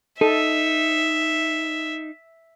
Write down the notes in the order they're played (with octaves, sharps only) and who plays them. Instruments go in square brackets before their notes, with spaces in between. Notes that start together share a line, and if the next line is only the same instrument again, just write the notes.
[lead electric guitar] D#4 [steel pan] A4 [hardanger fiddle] E5